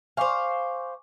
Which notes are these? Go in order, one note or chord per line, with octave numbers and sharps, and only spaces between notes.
C5 F5 G#5 C#6 D6